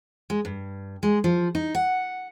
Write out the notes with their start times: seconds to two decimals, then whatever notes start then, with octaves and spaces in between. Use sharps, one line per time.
0.30 G#3
0.45 G2
1.03 G#3
1.24 F3
1.55 D#4
1.75 F#5